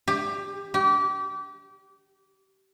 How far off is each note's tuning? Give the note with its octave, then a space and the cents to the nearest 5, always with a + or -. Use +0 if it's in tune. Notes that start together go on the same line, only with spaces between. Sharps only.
G4 +15
G4 -30